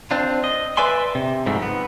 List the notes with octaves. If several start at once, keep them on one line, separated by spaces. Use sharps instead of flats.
C4 D4 F4
D#5
B4 D5 E5 G#5 C6
C3
G#2 F3 G3 A3
B3